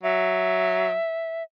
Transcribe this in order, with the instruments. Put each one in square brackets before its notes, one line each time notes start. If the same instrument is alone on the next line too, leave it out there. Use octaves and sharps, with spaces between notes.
[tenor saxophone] F#3 [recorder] E5